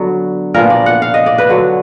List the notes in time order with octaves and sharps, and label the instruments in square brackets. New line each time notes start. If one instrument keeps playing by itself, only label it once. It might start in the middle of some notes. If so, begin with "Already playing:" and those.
Already playing: [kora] D3 F#3 B3
A#2 F3 B3 A#4
D5
F#5
F5
D#5
D5
B4
D3 F#3 B3